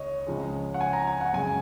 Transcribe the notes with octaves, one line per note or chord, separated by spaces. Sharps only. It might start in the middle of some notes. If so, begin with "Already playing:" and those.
Already playing: C#2 C#5 D#5
C#2 C#3 F3 G#3
F#5
G#5
A#5
G#5
F#5
F#2 C#3 G#3 G#5